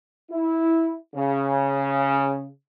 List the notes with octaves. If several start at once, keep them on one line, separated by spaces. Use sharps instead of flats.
E4
C#3